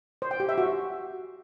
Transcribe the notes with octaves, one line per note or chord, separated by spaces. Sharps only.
C5
G5
G4
E5
F#4